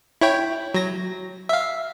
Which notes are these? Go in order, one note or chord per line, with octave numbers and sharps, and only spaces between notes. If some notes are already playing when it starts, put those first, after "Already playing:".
E4 C#5 G5
F#3 A#6
E5 F5